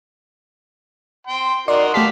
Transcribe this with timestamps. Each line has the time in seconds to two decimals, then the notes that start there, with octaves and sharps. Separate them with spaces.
1.27 G5 C6
1.68 D#4 F#4 A#4 D5 C6
1.94 A3 G4 D5 F5 A5 B6